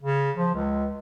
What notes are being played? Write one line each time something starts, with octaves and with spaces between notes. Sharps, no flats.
C#3
F3
C#2